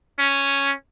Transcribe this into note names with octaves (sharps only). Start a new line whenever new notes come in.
C#4